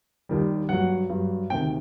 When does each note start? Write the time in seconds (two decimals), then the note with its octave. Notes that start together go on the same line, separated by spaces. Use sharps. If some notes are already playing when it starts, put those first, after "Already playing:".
0.29 D#2 D#3 G3
0.69 G2 F#3 F#5
1.10 G2 F#3
1.50 D2 C3 D#3 G5